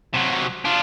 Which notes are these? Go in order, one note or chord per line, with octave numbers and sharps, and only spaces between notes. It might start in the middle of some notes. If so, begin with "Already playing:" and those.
C3 F#3
D4 F4